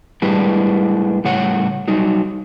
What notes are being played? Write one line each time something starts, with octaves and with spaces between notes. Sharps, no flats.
A2 G3 G#3 D4 E4 B4
A2 C#3 G3 C#5 F#5
F#3 G3 D#4